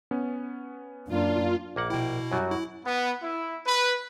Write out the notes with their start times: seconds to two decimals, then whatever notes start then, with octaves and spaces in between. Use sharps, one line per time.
0.11 B3 C#4
1.09 F#2 A#3 D4 F4
1.76 A#1 A#3 F#5 D6
1.90 B2 E4 G5
2.32 F#2 F#3 G3 F#4
2.51 E4
2.84 B3
3.23 E4
3.66 B4